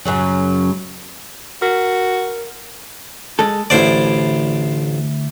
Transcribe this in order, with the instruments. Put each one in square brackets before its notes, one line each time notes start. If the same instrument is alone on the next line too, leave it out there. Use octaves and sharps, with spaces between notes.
[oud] F#2 C#3 F#3
[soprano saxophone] F#4 [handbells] A#4
[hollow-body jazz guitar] G#3 A4
[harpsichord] A1 C5 D5 [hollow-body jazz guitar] D2 E4